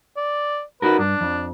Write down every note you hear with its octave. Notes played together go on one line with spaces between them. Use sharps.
D5
D#4 F#4 A#4 B4
G2 D4
F2